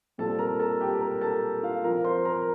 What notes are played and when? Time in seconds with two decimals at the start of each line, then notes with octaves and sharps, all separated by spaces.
0.18 A#2 G3 C4 F4 A4 A5
0.39 A#4 A#5
0.60 A4 A5
0.81 G4 G5
1.01 A#4 A#5
1.21 A4 A5
1.63 F4 F5
1.84 F3 C4 F4 A#4 A#5
2.04 C5 C6
2.25 A#4 A#5